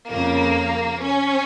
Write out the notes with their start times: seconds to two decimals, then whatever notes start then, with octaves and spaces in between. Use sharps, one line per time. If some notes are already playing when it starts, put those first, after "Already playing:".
0.11 F2 C#3 A#3
1.04 C#4